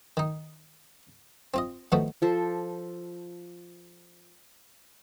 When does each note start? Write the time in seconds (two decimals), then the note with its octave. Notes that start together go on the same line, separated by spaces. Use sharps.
0.17 D#3 D#4
1.54 C4 F4 D#5
1.92 D#3 F3 A3 B3 F#4
2.22 F3 A4 C5